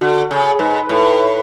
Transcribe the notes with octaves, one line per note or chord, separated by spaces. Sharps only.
D3 F#4
C#3 G#4
G#2 B4
A2